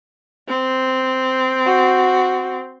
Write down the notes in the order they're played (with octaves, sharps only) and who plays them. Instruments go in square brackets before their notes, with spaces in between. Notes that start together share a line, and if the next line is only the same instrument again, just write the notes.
[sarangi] C4
[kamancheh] F#4